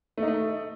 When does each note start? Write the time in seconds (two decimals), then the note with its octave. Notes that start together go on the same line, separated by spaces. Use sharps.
0.18 A3
0.23 D#4
0.28 A3